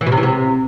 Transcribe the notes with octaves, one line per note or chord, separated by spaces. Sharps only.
E3
B2
C3
E3
C3